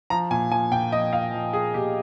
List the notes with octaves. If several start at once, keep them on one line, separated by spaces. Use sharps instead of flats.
F3 A#5
A#2 G#5
F3 G#5
A#2 G5
F3 D#5
A#2 F5
F3
F3 G#4
A#2 G4